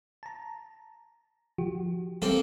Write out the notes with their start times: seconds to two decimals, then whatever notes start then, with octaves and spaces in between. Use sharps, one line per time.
0.23 A5 A#5
1.58 F3 F#4 G4
2.22 G3 A#3 C4 A4